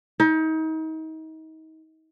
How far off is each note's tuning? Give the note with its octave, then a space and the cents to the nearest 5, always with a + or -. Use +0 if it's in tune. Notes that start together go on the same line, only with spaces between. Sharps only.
D#4 +35